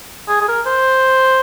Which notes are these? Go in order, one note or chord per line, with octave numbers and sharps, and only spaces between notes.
G#4
G#4
A#4
C5